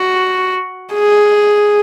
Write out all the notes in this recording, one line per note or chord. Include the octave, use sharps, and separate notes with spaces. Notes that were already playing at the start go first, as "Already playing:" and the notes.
Already playing: F#4
G#4